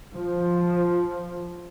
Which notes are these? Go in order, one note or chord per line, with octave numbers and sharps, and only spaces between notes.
F3